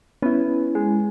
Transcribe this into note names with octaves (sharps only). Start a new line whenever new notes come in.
B3 C#4 E4
G#3